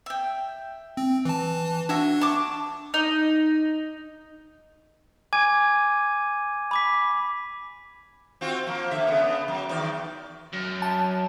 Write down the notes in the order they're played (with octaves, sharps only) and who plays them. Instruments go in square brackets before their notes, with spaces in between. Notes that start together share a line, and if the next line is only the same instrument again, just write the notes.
[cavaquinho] E5 G5
[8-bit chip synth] C4
E3 A5
[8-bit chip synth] D4 [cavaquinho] F#4 E5 G#5
[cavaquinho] A5 C#6 D6
[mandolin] D#4
[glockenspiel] G#5 D6 G#6 D#7
B5 D6 B6
[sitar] C4 F4 F#4
F3 A#3
D3 E5
C#3 B3
F#3
E2 D#3 D5
[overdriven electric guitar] F#2
[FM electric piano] A5